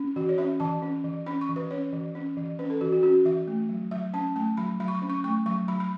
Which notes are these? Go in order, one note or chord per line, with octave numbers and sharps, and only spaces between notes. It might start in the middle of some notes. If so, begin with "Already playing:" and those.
Already playing: C#4
E3 F#4
C#5
C#4 E5
E3 A5
C#4
E3
C#4 B5
C#6
E3
B4
C#4 C#5
E3
C#4
E3
C#4 B4
A4
E3 F#4
F#4
C#4 F#4
E3 E5
A3
F#3
F#3 E5
C#4 A5
A3 A5
F#3 B5
F#3 B5
C#6
B5
C#4
C#6
A3 C#6
F#3 C#6
F#3 B5
B5